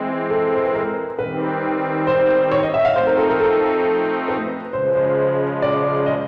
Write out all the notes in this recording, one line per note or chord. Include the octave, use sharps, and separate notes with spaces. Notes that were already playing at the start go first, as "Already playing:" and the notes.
Already playing: E3 G#3 C4
A4
C5
B4
A#4
D#3 G3 C4 B4
C5
C#5
D#5
E5
F5
F3 A3 C4 D#4 C5
A#4
A4
A#4
A4
B4
C#3 F3 G#3 C5
C5
D5
D#5